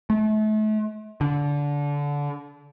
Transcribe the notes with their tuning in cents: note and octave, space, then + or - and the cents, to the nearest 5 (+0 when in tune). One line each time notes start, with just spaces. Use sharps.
A3 -35
D3 -20